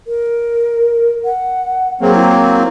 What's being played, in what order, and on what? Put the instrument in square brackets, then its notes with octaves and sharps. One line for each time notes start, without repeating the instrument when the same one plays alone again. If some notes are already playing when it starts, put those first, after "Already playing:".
[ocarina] A#4
F#5
[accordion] F#3 A#3 C4 [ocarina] G#4
[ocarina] E4